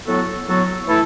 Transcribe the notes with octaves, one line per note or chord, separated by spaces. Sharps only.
A2 F#3 B3 F#4 A4
A2 F#3 B3 F#4 A4
E3 A3 E4 A4